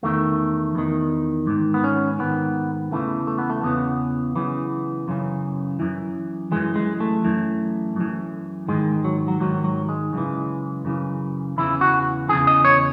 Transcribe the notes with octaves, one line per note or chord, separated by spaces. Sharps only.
E2 D#3 A3
E2 D#3
G#2 D#3
B3
C#4
G#2 D#3 B3
E2 C#3 E3 A3
A3
B3
A3
E2 C#3 E3 B3
F#2 C#3 E3
F#2 C#3 E3
F#2 E3
F#2 E3 G#3
G#3
A3
F#2 E3
F#2 E3
G#2 D#3 G#3
F#3
F#3
G#2 D#3 F#3
F#3
G#3
F#2 C#3 E3
F#2 C#3 E3
E2 C#3 E3 E4
F#4
E2 C#3 E3 G#4
D#5
C#5